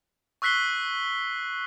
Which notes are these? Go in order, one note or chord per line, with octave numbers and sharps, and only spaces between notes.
C#6 E6 F#6 B6 C7 G7